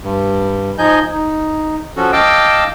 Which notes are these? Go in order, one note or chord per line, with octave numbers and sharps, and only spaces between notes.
G2
F3 D#4 D#5 G#5 G6
D#4
F3 C#4 F#4 A4
D#5 F5 G5 A5 D6 E6